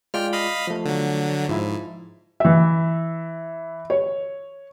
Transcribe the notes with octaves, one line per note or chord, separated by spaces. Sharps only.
G#3 F4 D5 G5 F6
D#5 F5 B5
F3 A3
D3 F#3
G#2 F3 E4
E3 E5
C#5